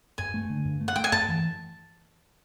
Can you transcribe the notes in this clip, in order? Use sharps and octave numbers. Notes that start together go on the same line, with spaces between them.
G2 G#5
A3
D3
G2
A3
F#5
A3 G5
G#5
G2 A5
E3